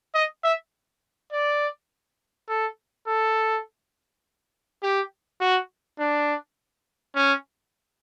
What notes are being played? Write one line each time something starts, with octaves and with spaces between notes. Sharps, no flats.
D#5
E5
D5
A4
A4
G4
F#4
D4
C#4